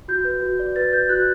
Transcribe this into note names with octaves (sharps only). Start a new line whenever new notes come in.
F#4 G6
B4
F#4
D5
B4 A6
B4 G6
F#4 F#6